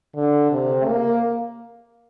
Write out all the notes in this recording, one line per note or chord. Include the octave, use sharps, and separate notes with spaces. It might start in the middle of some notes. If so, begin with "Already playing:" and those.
D3
C3
A#3